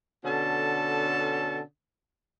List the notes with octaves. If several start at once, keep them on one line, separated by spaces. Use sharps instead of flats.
B2 D3 C#4 A4 A5